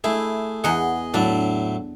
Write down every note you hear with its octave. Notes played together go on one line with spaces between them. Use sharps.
A3 E4 G#4
E2 G#4 D#5 F#5
A2 F#3 D4 E4